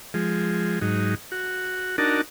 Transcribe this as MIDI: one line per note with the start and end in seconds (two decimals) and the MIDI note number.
0.14 0.79 53
0.14 0.79 56
0.81 1.15 44
0.81 1.15 54
0.81 1.15 63
1.32 1.96 66
1.98 2.21 62
1.98 2.21 63
1.98 2.21 66
1.98 2.21 70
1.98 2.21 81